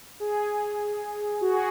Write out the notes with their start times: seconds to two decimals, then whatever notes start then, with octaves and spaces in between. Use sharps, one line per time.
0.20 G#4
1.41 F#4
1.53 G#4